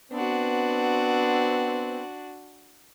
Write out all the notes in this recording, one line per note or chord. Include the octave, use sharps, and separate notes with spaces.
B3 C4 D4 F#4